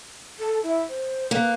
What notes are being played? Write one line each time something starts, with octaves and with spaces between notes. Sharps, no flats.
A4
E4
C5
A#3 B4